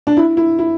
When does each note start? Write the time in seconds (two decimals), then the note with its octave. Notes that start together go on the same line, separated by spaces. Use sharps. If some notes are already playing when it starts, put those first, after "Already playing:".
0.07 D4
0.17 E4
0.37 E4
0.59 E4